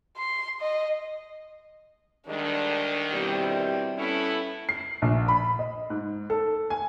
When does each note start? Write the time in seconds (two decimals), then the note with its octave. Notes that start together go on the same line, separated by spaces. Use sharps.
0.17 C6
0.61 D#5
2.28 D2 D#3 G3 G#3 D4
3.12 B2 G3 C4 E4
3.98 A2 B3 C#4 E4 A4
4.69 C7
5.02 A#1
5.28 B5
5.59 D#5
5.90 G#2
6.30 A4
6.70 G#5